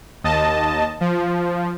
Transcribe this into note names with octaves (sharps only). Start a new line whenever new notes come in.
D#2 D#5 A5
F3